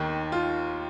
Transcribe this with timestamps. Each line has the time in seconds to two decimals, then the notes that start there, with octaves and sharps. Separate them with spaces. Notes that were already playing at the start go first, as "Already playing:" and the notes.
Already playing: D#2 D#3
0.32 F4